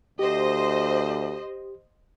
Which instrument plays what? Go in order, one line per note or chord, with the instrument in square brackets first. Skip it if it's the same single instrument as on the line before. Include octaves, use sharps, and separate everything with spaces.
[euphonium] D2 [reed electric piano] G4 [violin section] C5 D#5